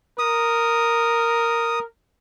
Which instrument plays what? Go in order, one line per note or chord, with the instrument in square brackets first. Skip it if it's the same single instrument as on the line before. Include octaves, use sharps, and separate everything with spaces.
[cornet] A#4 [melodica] D#6